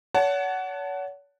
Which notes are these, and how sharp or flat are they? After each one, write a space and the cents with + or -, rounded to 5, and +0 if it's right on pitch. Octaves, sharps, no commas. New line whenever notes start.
C#5 +40 F#5 +10 A5 +0